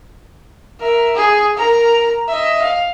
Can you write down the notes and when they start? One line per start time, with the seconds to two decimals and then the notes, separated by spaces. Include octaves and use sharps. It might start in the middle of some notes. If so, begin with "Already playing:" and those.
0.80 A#4 E5
1.15 G#4
1.57 A#4 A#5
2.28 D#5 E5
2.62 F5